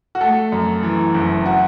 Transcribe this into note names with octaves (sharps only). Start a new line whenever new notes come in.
F#4
A3 A4
F#2
E3
F#1
F#4